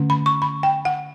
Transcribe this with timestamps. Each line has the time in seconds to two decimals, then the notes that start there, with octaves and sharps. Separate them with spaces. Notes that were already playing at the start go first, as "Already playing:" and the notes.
Already playing: D3 A3 C#4
0.10 B5
0.26 C#6
0.42 B5
0.63 G5
0.85 F#5